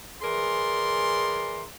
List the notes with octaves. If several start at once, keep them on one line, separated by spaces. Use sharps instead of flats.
E3 G#4 A#4 D5 C6